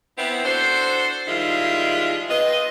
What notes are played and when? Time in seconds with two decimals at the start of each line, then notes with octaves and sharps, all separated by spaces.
0.18 B3 C4 E4
0.44 D4 F#4 A4 C5
1.28 D#3 F3 G3 G#3 E4 F4
2.29 C4 F4 B4 D#5